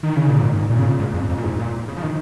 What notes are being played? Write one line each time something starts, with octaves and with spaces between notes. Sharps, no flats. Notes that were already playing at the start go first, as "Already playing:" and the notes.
D#3
C#3
A#2
G#2
G#2
A#2
C#3
A#2
G#2
F2
F2
A#2
G#2
A#2
C#3
F3
D#3